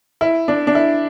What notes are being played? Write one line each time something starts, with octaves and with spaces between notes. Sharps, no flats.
E4
D4
D4
E4